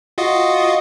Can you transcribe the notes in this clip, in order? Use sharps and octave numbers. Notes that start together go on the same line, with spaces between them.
F4 F#4 D#5